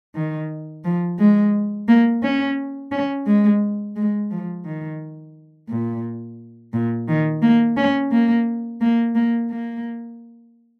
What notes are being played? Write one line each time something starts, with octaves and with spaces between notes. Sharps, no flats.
D#3
F3
G#3
A#3
C#4
C#4
G#3
G#3
F3
D#3
A#2
A#2
D#3
A#3
C#4
A#3
A#3
A#3
A#3